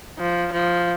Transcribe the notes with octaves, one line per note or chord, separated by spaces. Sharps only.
F3
F3